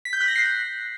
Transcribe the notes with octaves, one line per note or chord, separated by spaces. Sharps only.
B6
G6
F#6
A#6
C7